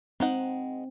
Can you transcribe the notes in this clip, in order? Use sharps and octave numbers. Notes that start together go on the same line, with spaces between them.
G#3 C4 D#4 F#5